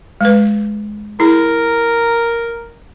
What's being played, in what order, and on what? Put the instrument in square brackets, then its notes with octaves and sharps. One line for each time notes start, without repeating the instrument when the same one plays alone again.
[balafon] G#3 B4
[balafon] E4 G#4 [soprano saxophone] A#4